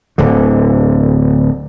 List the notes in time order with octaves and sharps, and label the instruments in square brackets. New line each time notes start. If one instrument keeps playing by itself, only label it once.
[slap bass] D1 D3